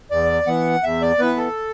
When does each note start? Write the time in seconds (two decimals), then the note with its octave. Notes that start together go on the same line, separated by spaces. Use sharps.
0.10 E2 D5
0.47 E3 B3 F#5
0.83 E2 E5
1.02 D5
1.19 E3 B3 B4
1.37 A4